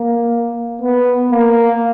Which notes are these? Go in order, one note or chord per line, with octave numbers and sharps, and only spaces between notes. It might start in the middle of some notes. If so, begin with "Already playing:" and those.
Already playing: A#3
B3
A#3